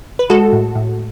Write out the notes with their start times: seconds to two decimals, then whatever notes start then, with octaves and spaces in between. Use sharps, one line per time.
0.19 B4
0.30 G#3 F#4 A4
0.53 A2
0.75 A2